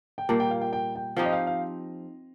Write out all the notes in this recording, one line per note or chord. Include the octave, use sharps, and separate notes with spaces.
G5
A#2 G3 A#3 A5
G5
F5
G5
G5
G5
F3 C4 D#4 G4 F5
D#5
F5
F5